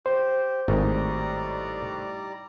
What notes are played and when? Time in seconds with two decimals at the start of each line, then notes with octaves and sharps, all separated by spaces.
0.06 G4 C5
0.68 G#1 A2 G3 D#4 D5 D#5 A#5